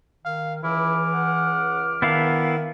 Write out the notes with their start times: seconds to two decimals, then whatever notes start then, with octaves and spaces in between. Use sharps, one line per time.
0.25 D#3 F5
0.63 C#2 E3 E4 D6 F6
1.14 F#5
2.02 D#3 B3 D4 E4 F5